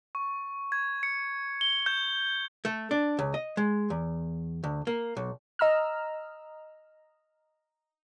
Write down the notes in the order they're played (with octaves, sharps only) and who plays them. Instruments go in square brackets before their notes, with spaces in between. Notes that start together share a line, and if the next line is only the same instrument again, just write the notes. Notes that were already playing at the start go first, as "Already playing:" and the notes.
[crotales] C#6
G#6
C#7
G7
G6
[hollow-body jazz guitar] A3
D4
C#2
D#5
G#3
E2
D2
A#3
B1
[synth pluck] D#5 A#5 E6 F6